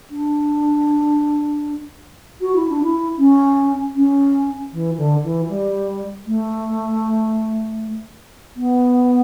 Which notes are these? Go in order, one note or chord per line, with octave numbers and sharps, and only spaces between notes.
D4
F#4
E4
D4
E4
C#4
C#4
E3
D3
E3
G3
A3
B3